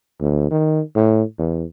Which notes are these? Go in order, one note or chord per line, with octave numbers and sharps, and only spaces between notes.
D2
D#3
A2
E2